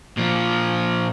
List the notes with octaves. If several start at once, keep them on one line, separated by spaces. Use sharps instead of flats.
A#2 F3